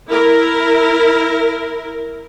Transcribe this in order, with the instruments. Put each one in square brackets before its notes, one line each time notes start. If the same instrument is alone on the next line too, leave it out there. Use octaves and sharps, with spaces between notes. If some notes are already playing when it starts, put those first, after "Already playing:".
[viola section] E4 A#4